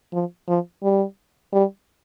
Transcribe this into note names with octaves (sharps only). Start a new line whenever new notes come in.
F3
F3
G3
G3